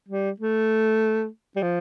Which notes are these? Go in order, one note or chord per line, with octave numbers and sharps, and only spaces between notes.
G3
A3
G3
F3